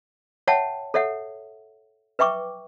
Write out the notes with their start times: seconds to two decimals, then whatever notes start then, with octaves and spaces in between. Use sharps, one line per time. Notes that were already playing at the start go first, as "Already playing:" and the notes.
0.48 C#5 E5 F#5 G5 A5
0.94 A4 C#5 E5 F#5
2.19 B4 E5 G5 C#6 D6